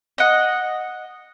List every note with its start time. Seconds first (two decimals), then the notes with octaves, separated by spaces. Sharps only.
0.18 D#5 F#5